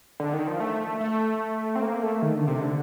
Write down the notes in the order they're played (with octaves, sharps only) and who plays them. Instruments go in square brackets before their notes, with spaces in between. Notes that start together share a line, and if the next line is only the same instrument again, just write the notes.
[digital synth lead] D3
D#3
F3
A3
A3
C4
A#3
A3
D#3
D3
C3
D3